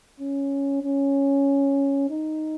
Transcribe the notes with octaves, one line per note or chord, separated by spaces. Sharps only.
C#4
C#4
D#4